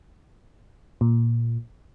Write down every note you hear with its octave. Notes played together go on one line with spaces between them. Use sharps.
A#2